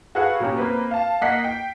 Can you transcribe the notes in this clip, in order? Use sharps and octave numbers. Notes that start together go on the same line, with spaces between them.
F#4 G#4 A4 B4 F5 F#5
B2 A#3 C#4 G4
A#3 C4 B4
F5 A5
A#3 D#5 F#5 B6 C7
G5